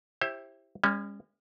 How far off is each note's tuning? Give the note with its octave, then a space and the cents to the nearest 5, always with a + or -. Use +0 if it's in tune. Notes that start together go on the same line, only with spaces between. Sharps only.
E4 +0 G4 +5 C5 +35
G#3 -45 C#4 +0